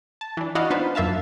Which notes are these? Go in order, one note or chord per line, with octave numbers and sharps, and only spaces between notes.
A5
E3 D4
E4 F#4 D5 D#5 F5 F#5
B3 D4 D#4 F4 B4 C5
F#2 A#3 E5 F5 A5